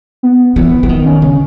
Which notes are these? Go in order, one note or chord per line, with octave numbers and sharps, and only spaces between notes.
B3
E3 B3
E3
D#3 B3
C#4
C#3 C#4